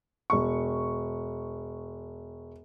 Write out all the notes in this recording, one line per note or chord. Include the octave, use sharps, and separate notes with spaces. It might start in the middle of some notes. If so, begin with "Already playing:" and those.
E1 C#6